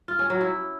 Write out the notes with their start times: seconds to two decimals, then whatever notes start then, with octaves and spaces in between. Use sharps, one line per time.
0.08 F4
0.19 C#4
0.30 F#3
0.41 E4